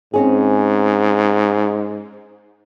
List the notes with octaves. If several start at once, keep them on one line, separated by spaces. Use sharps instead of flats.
G#2 C4 C#4 G#4